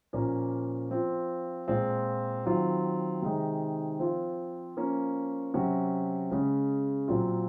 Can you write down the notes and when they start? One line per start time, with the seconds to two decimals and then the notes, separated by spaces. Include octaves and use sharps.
0.13 A#2 F3 A#3 C#4
0.90 F3 C4 F4
1.68 A#2 G#3 C4 F4
2.45 D#3 F#3 C4 F4
3.22 C3 D#3 G#3 D#4
3.99 F3 C4 F4
4.77 F3 A#3 C#4
5.54 C3 F#3 C#4 F#4
6.31 C#3 G#3 C#4
7.08 A#2 F#3 C4 F4